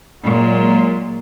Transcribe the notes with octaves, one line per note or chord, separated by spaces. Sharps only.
A#2 F#3 G#3